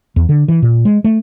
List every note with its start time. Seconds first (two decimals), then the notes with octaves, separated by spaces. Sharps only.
0.16 E2
0.29 D3
0.48 E3
0.62 A#2
0.85 G#3
1.04 A3